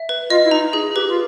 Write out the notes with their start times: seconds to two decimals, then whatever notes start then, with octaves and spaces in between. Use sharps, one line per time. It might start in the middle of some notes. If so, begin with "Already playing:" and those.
Already playing: E5
0.09 B4
0.30 F4 D#5
0.44 E4
0.51 D#4 A#5
0.73 G#4
0.95 G4 B4
1.09 F4